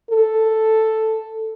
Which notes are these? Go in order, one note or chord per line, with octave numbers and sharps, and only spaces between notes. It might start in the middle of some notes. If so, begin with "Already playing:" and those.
A4